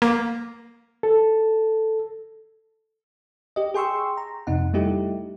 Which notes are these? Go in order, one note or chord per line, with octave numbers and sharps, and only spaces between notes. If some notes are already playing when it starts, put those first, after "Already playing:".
A#3
A4
G4 D#5
G#4 G5 C6 C#6 E6
A#5
F2 C3 D#4 F#5
G3 A3 D#4 E4 G4